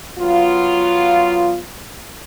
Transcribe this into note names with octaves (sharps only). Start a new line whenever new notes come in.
F#3 B3 F4